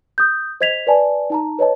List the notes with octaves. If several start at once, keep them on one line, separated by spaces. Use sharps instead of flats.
D#6 G6
C5 D#5 G#6 B6 F7
B4 D5 G#5 A5
D#4 A5 A#5
B4 C#5 D#5 A5